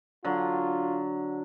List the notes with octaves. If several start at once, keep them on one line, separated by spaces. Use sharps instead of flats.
D3 F#3 F4